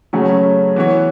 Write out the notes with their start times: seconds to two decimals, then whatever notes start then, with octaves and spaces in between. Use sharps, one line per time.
0.13 F#2 C#3 F#3 A3 C#4
0.76 E3 B3 F#4 C#5